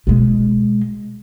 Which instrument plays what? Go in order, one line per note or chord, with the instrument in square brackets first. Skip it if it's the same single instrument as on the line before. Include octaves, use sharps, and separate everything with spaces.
[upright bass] B2 G#3